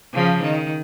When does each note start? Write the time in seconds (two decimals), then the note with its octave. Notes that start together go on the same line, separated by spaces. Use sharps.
0.14 C#3 F3
0.43 D#3